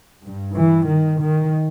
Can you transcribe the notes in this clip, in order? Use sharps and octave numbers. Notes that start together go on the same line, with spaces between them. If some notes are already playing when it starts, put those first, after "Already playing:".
G2
E3
D#3
D#3